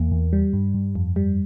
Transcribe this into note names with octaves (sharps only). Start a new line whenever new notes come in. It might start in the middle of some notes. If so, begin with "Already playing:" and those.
Already playing: E2 A#3
E2
G3
G2
G2
F2
G3